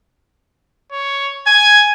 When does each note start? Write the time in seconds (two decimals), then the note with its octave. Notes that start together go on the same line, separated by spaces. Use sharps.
0.92 C#5
1.47 G#5 G#6